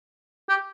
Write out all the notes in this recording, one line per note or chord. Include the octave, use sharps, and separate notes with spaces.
G4